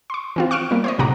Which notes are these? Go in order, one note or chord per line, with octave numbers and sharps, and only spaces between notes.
C6 C#6
E3 C4 F4
C#6 F6 F#6 D7 E7
G3 A#3
C5 C#5 D#5
B1 A2 C3 F#5 A#5 D6